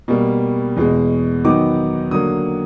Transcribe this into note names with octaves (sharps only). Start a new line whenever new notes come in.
B2 G3 A#3
E2 B2 G#3
D#3 F#3 B3 D#4 D6
D3 F#3 A#3 D#6